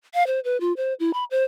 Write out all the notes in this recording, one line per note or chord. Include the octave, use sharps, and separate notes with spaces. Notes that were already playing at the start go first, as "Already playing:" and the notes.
F5
C5
B4
F4
C5
E4
B5
C5